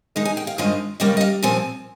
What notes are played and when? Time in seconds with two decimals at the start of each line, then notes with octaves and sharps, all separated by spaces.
0.16 D#3 G#3 D#4 D#5
0.25 G#5
0.37 G5
0.47 F5
0.58 G2 D#3 G#3 C4 F4 D#5
1.00 D#2 C#3 G3 A#3 D#5
1.17 D#5
1.21 F5
1.43 A#2 F3 C4 G#5